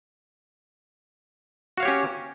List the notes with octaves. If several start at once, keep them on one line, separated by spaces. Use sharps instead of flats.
C#4 F#4 G4 C#5 F5